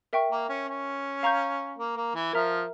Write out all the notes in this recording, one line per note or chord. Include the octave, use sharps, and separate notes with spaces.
A#4 E5 G5 C#6
A#3
C#4
C#4
F5 A#5 C#6 G6
A#3
A#3
E3
F3 A#4 E5 A#5 F6